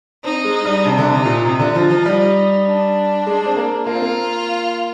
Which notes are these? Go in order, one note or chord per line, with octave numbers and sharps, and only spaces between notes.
C4 D#4
G#3
G3
C3 D4
D3
C3
D#4
A#2
C3 D#4
D3
F3
F3
G3
D4
G#3
C4
A#3
A#3 F4
C4
A#3